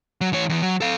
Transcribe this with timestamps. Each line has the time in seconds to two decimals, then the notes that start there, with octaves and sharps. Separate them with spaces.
0.21 F#3
0.33 E3 C#5
0.49 E2 E3
0.62 F#3
0.81 A4 F5